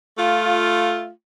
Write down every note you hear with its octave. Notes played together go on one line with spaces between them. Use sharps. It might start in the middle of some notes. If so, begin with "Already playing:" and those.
A3 F4